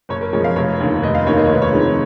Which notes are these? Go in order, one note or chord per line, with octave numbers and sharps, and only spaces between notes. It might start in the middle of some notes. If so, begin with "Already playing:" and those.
F#1 C#5
A#4
F2 F3 G#3 C#5
F5
F1 C#5
D#2 D#3
F1 D#5
F5
D#2 D#3 A#3 C#5
D#5
C#5
F1 B4
C#5
F2 D#3 G#3